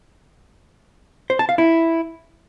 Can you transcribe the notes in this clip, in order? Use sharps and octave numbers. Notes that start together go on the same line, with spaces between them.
C5
A5
F5
E4